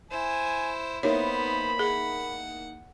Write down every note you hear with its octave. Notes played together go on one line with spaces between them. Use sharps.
E4 C5 G#5
A#3 B3 D#4 E4 C5 C#5 B5
G#4 F#5